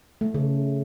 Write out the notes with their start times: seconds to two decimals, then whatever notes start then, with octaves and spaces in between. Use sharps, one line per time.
0.21 A3
0.34 C#3